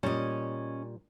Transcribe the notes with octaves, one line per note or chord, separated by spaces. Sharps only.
A#2 G3 C#4 D#5